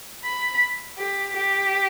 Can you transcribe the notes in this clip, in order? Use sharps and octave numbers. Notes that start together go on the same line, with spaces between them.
B5
G4
G4